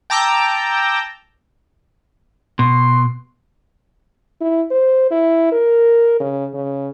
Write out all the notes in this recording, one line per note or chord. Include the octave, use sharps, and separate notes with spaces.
G5 A5 A#5 D6 E6 G6
B2 C6
E4
C5
E4
A#4
C#3
C#3